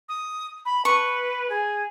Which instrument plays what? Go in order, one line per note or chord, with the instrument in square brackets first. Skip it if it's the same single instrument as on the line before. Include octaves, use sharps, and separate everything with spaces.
[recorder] D#6
B5
[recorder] B4 [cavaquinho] C#6
[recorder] G#4